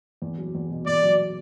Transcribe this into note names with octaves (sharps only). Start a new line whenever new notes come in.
E2
F#3
E2
B2
E2 D5
F#3